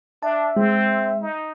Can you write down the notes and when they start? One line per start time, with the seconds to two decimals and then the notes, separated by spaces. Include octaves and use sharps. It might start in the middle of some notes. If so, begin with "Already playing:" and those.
0.22 D4 E5 A5
0.56 G#3 C4
1.22 D#4